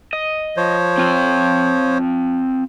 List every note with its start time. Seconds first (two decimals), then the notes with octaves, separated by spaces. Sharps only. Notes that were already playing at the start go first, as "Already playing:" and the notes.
0.13 D#5
0.57 F3 C5 C#5
0.98 C4 F4